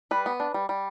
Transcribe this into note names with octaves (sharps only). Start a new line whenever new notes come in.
G3 B4
B3
D4
G3
G3